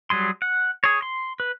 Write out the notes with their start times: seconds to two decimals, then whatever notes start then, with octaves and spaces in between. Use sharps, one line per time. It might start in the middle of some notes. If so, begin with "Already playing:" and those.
0.10 F#3 G3 G#4 C6
0.42 F#5
0.84 G#4 C#5
1.02 C6
1.40 B4